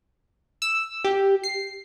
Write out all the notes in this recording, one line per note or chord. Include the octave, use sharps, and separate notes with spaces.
E6
G4
C7